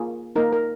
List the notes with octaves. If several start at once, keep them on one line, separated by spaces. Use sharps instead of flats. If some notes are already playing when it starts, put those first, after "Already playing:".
Already playing: A#3 F4 G#4
A#3 D#4 A#4
A#4